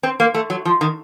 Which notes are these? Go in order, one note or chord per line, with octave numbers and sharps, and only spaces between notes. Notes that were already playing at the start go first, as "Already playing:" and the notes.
C4
A#3
A3
F#3
F3
D#3